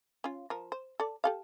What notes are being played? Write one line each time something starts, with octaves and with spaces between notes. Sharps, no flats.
C#4 F4
F3 A#4
C5
A4 D5
G4 A4 F5